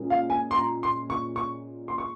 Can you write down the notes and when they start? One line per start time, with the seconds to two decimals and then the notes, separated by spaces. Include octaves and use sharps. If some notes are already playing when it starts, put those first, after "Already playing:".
Already playing: A#2 G#3 C#4
0.10 F5
0.30 G#5
0.51 C6
0.56 A#5
0.83 C6
1.10 C#6
1.36 C#6
1.88 C6
1.98 C#6